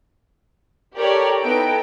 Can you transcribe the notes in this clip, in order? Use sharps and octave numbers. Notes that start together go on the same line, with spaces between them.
G4 A4 A#4 C#5 D5
B3 D#4 E4 A4 G5 D7